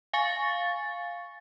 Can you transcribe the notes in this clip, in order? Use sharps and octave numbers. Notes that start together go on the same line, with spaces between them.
F5 G#5 C#6 A6